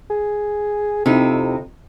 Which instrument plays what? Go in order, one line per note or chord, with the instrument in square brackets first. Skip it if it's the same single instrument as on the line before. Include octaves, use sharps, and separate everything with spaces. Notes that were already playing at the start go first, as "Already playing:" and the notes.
[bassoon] G#4
[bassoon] F2 [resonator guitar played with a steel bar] C3 D#4 E4